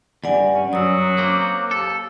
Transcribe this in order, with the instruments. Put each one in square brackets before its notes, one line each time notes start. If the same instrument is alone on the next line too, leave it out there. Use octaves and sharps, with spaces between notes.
[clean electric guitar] E2 G2 [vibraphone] D5 F#5 G#5
[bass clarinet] C#4
[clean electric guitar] F#2 [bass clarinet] F#3 [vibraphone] D#6 E6
[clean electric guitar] A#3 C4 [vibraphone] D6
[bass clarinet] D#2 [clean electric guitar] A4